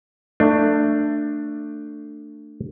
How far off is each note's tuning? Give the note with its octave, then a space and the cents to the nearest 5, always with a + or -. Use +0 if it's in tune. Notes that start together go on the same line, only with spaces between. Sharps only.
A3 +20 D4 +15